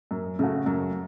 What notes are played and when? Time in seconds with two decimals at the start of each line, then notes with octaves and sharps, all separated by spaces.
0.11 F#2
0.39 C#3 A3 F#4
0.66 F#2